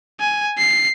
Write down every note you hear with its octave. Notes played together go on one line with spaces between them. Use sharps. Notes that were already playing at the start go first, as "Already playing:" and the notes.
G#5
C7